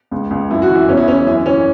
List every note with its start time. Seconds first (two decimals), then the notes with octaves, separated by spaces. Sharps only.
0.11 C#2
0.31 C#2
0.51 F#2 E4
0.62 F#4
0.70 E3
0.75 E4
0.88 E2 C#4
0.97 E4
1.07 E3 C#4
1.27 F#2 E4
1.46 E3 C#4